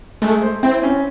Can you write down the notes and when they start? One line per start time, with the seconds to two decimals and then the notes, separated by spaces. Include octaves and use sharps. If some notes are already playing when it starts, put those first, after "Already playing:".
0.22 G#3 A3
0.42 C5
0.63 C4 E4
0.83 C#4